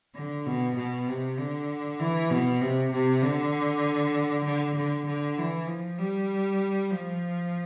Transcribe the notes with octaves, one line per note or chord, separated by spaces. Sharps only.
D3
B2
B2
C3
D3
E3
B2
C3
C3
D3
D3
D3
D3
E3
F3
G3
F3